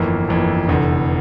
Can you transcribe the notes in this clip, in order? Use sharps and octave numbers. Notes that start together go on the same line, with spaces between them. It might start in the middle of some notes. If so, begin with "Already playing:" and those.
Already playing: G1 F2 E3 A#3
G1 F2 E3 A#3
F1 E2 D3